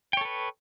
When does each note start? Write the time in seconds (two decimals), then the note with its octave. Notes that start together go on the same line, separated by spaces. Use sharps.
0.13 G5
0.17 C#5
0.21 A4
0.25 B4